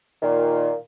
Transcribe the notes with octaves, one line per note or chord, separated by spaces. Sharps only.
A#2 D#3